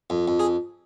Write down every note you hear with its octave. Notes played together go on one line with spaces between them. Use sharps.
F2
F2
G#4